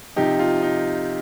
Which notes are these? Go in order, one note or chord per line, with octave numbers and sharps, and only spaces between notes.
C3 F3 D#4 G4
F4
D#4